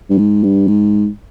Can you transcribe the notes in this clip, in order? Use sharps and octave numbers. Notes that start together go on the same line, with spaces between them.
G2
G#2
G2
G#2